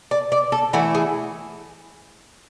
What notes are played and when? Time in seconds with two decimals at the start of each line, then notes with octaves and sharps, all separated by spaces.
0.11 D5
0.32 D5
0.52 A4
0.73 E3 A3 E4 F#4
0.95 G#4